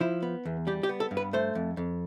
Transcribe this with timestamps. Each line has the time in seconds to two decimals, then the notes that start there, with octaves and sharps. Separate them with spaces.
0.01 F3 E4
0.22 B3
0.45 E2
0.67 G3 G4
0.83 G4
0.89 B3
1.00 A4
1.11 G2
1.17 B4
1.33 A3 C5
1.55 F2
1.77 F2